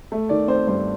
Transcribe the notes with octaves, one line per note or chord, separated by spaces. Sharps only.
A3
D#3 D5
C4 C5
G2 C5